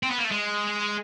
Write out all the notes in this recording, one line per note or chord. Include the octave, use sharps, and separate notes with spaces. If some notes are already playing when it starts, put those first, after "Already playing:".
C4
B3
A#3
A3
G#3